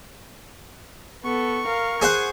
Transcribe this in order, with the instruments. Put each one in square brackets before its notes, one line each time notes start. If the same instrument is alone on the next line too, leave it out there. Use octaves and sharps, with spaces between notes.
[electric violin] B3 A4 [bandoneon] C#6
[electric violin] A#4 F5
[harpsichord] G#4 C5 F#5 [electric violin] G#6